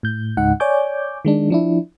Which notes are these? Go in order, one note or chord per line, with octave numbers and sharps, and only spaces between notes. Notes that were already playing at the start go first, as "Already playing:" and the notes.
A2 G6
C#2 G#2 D#4 F#5
C#5 D5 G#5 D6 G6
D#3 G#3 D4
F3 D4 E4